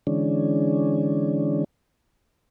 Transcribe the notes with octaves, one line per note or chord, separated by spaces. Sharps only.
D3 E3 G#3 C#4 D4